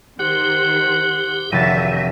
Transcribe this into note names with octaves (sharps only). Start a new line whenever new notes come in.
D#3 G4 C5 F#5
F1 D3 D#3 F#4 E5 F#5 A6